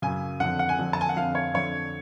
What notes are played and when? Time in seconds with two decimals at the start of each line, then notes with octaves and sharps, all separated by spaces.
0.02 F#2 C#3 G#5
0.40 F2 D3 F#5
0.59 F#5
0.69 G#5
0.78 F2 D3
0.93 A5
1.01 G#5
1.09 F#5
1.16 F2 D3 F5
1.35 C#5
1.54 F2 D3 C#5